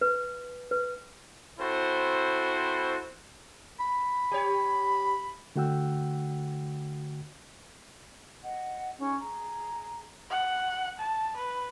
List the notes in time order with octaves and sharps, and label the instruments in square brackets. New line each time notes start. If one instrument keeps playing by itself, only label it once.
[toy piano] B4
B4
[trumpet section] C4 E4 F#4 A4 C5
[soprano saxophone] B5
[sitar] G4 C#5
[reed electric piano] D3 A3 F#4 F#5 G5 E6
[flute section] D#5 F#5
C#4 D#4 G#4
G#4 A#5
[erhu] F#5
A5
B4